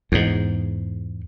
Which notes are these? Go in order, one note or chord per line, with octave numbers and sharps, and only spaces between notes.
E2 G#2